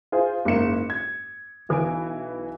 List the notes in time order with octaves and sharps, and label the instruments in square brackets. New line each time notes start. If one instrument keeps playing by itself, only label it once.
[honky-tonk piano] F4 G#4 C5
F#1 G#2 A#3 C#7 E7
G#6
B1 E3 E4 G#5 D7